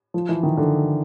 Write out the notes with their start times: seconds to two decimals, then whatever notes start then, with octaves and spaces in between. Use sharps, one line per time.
0.14 F3
0.29 E3
0.43 D#3
0.57 D3